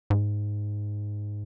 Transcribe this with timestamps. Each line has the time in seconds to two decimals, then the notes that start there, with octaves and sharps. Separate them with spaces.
0.10 G#2